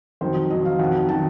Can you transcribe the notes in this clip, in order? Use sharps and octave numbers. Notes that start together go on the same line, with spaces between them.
F2 D#3 F#3 C5
F2 D#3 F#3 D#5
F5
F2 D#3 F#3 F#5
D#3 F#3 A5